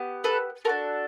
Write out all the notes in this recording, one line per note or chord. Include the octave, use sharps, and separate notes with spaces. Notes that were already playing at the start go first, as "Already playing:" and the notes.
Already playing: B3 G4
A4 B4
D4 F#4 A4 A#4